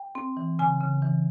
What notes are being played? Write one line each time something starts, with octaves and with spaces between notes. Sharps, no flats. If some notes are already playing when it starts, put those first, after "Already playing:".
Already playing: G5
C4
E3
C#3 G#5
C#3
E3